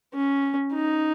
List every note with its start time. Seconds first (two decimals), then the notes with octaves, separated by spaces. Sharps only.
0.14 C#4
0.74 D#4